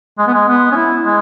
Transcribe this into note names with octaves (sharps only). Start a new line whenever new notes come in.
G#3
B3
G#3
B3
C#4
E4
G#3